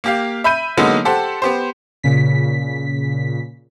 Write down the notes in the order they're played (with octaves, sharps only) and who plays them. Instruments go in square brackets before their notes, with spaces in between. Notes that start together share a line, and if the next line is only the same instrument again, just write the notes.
[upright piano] A#3 G4 F5
E5 B5 G6 D#7
D3 F#3 G#3 A#3 B3 D#4
G4 A4 C5 F#5
B3 G4 C5
[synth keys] A#2 C#3 B6